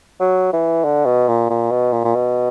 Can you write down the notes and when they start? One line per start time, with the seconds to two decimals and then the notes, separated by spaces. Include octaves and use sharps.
0.20 F#3
0.53 E3
0.84 D3
1.06 B2
1.28 A#2
1.50 A#2
1.71 B2
1.92 A#2
2.04 A#2
2.15 B2